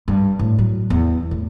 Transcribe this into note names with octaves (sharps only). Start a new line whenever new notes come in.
G2
A2
F#3
E2
A2